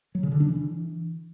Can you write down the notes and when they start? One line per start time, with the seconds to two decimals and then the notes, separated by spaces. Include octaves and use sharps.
0.15 F#3
0.23 C#3
0.32 D3
0.40 D4
0.49 E3